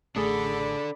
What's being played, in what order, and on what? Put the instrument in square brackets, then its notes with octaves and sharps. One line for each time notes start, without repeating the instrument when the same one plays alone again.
[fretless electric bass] A1 A3 [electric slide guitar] D4 A4 [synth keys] G#4 [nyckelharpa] D5 B5